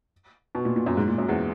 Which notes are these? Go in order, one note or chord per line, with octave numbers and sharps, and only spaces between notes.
B2
A#2
A#2
F#2
G#2
A#2
F#2
E2